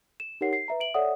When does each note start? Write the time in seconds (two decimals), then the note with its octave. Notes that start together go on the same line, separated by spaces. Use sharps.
0.20 E7
0.41 D#4 G4 A#4 C#5 F#5 C7
0.53 C7
0.68 B4 E5 A#5
0.80 E5 D7 F#7
0.94 A4 C#5 D5 E5 F#5 D#6